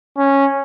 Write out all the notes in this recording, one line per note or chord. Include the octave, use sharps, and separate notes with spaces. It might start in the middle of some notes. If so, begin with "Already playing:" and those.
C#4